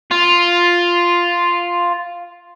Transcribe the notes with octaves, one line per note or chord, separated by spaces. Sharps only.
F4